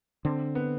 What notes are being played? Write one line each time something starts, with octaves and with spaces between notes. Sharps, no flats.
D3 C4
B3